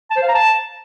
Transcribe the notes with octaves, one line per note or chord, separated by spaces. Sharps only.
A5
C5
F5
A#5
A5